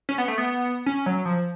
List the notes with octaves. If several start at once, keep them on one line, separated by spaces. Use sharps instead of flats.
C#4
B3
A3
B3
C#4
F#3
F3